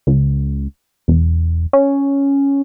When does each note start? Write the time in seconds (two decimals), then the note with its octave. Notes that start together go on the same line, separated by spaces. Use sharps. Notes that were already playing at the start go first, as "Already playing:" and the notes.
0.07 C#2
1.08 E1
1.73 C#4